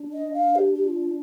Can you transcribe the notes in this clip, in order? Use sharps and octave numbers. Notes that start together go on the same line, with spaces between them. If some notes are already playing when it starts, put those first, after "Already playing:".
Already playing: D4
D#5
F5
G4
G4
F4